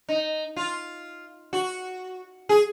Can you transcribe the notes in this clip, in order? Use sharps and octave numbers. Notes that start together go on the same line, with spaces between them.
D#4
F4
F#4
G#4